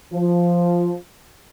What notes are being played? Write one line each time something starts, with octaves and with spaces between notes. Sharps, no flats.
F3